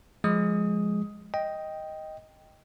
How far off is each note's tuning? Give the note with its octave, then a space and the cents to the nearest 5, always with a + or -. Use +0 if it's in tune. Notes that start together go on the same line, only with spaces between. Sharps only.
F3 +10 G#3 +0 D#6 +10
D#5 +5 G5 +0